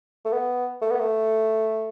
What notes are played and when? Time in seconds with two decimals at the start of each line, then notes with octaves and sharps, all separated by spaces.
0.25 A3
0.32 B3
0.82 A3
0.91 B3
1.00 A3